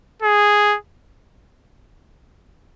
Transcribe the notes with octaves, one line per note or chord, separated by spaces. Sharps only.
G#4